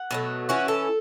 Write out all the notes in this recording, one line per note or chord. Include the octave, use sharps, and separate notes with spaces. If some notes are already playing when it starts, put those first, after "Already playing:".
Already playing: F#5
B2 F#3 A3
E3 C#4 E4 F#4
A4